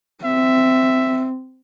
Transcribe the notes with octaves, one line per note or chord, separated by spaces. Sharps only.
C4 E5